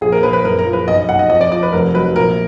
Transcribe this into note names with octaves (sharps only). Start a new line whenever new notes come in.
A#1 G#4
A#4
A#1 B4
B4
F#1 A#4
A#4
F3
B4
B1 D#5
D#5
B1 F#5
D#5
F2 D#5
D5
F3 D5
B4
F1 A#4
F#3 B4
A#1 A#4